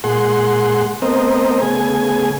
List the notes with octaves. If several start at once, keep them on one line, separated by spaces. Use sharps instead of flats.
A#2 G#3 G#4 F#5 C6
A3 B3 C4 A#4 C5 D#5
C#3 A3 B3 G#4 G#5